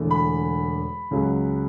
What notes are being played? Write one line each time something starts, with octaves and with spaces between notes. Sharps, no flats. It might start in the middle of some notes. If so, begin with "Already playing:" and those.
Already playing: E1 E2 D3 A3
B5
C#2 C#3 F#3